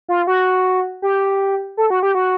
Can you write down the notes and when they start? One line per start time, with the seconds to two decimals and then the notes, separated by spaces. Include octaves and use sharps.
0.08 F4
0.27 F#4
1.02 G4
1.77 A4
1.90 F#4
2.03 G4
2.15 F#4